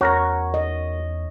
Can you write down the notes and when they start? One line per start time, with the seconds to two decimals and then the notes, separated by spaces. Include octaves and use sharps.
0.01 E2 F#4 A#4 C#5 A#5
0.54 D#5